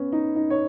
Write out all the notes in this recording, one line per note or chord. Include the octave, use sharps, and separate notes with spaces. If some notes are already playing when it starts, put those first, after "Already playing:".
Already playing: B3 C#4
D#4
D#4
C#5